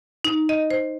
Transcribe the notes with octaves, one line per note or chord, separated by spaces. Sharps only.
D#4
D#5
C5